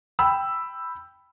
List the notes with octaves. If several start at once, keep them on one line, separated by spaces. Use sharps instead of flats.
G5 B5 E6